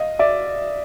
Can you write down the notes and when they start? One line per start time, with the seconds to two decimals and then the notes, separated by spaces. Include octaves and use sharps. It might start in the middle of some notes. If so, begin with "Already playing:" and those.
Already playing: D#5 F5
0.19 D5 E5